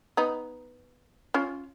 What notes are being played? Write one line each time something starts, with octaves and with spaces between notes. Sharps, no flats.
B3 D#4
C#4 F4